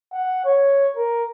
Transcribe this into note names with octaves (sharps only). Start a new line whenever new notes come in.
F#5
C#5
A#4